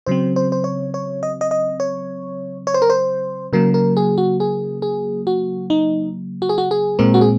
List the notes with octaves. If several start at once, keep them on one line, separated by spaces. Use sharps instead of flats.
C#3 F#3 C4 C5
C5
C5
C#5
C#5
D#5
D#5
D#5
C#5
C#5
C5
A#4
C5
C#3 F#3 A#3 A#4
A#4
G#4
F#4
G#4
G#4
F#4
D#4
F#4
G#4
F#4
G#4
A#2 G#3 C4 A#4
F#4
G#4